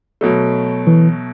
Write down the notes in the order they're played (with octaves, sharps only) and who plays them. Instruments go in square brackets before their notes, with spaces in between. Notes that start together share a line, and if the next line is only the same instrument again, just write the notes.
[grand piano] B2 F#3 A3
[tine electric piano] E3